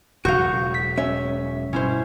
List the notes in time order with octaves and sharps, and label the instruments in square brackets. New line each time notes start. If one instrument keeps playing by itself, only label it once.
[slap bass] E1 C#3 F#3 [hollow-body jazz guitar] F#4 F5 [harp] C#6 G6
[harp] B6
[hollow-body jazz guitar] C#4 [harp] E5
[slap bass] G2 B2 [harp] C#4 E4 C5